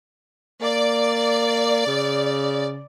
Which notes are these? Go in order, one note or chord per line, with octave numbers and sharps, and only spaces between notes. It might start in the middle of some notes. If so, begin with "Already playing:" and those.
A#3 D5
C#3